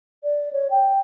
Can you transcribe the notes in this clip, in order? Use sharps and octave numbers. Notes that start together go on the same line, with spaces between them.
D5
C#5
G5